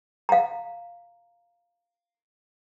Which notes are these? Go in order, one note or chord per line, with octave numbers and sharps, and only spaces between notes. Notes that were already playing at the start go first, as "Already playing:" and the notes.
F5 A#5